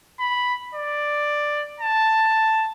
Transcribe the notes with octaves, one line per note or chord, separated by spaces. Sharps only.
B5
D5
A5